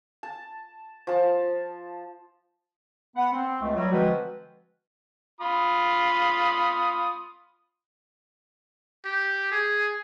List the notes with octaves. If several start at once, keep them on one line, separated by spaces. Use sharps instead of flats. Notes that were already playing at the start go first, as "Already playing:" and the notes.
A5
F3 A5
B3 F#5
C4
C#2 A3
F#3 G3
D3 F3 G#3 C4 F#4 B4
F4 B5 D#6
G4
G#4